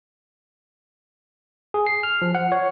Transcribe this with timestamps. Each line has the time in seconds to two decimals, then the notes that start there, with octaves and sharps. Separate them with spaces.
1.74 G#4
1.87 C7
2.03 F6
2.22 F3
2.35 F#5
2.52 C#5